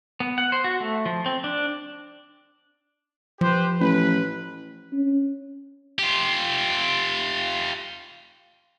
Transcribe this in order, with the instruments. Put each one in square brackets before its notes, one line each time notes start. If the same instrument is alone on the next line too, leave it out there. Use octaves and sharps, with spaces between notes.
[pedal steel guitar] B3
F#5
C5
F#4
A3
F3
C4
D4
[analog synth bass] F3 [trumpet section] G4 B4 C5
[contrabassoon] A1 [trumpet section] B4
[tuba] C#4
[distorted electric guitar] F4 G4